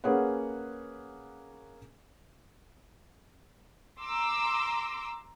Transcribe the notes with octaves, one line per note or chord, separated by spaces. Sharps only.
A#3 C#4 G#4 B4 C#5 F#5
A#5 C6 D6 E6